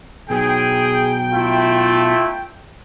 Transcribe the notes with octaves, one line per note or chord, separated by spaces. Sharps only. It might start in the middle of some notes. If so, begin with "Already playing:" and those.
B2 F#3 B3 G#4 G5
A3 E4 F4